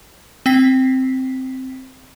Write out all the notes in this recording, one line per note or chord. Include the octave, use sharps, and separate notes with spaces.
C4 G5 B6 C7